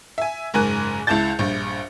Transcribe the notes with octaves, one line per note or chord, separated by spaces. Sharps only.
E5 G#5
F#1 G#2 A#4 G#5 F#6
C#2 E4 A5 G6 A6
A#1 G2